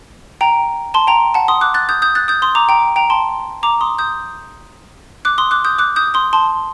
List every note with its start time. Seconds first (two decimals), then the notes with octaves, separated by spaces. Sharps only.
0.41 G5 A#5
0.94 A5 C6
1.07 G5 A#5
1.34 F#5 A5
1.48 C6 D#6
1.61 D6 F#6
1.74 F#6 A6
1.89 D#6 G6
2.02 D#6 G6
2.15 F#6 A6
2.28 D#6 G6
2.42 C6 D#6
2.55 A#5 D6
2.69 G5 A#5
2.96 G5 A#5
3.10 A5 C6
3.63 A#5 D6
3.81 C6 D#6
3.99 D#6 G6
5.25 D6 F#6
5.38 C6 D#6
5.51 D6 F#6
5.65 D#6 G6
5.78 D6 F#6
5.96 D#6 G6
6.14 C6 D#6
6.33 A5 C6